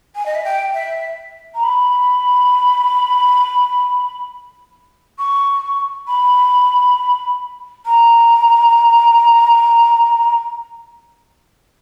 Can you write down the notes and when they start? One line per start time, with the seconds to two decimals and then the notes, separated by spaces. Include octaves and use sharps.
0.15 G#5
0.25 D#5
0.34 E5
0.44 G5
0.73 E5
1.54 A#5
1.63 B5
5.18 C#6
6.07 B5
7.85 A#5